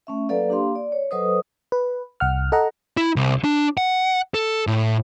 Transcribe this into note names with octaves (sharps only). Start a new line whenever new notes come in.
A3 C#4 E5
F#3 A#3 A4 B4 D5 F5
A#3 D4 G4 F5 C6
D5
C#5
F#3 A4 B4 C5 D#5 D#6
B4
C2 F#5 F6
A4 D#5 F#5 A#5
E4
C2
D4
F#5
A4
A2